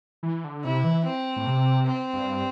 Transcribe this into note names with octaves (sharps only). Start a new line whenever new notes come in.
E3
D3
C3 E4
E3
C4
A2
C3
C4
G2